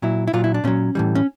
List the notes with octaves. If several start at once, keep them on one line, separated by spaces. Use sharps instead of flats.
A#2 F#3 E4
E4
A#2 F#3 F4
E4
D4
A#2 F#3 C#4
A2 E3 G3
C#4